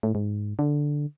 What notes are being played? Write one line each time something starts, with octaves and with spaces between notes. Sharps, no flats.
A2
G#2
D3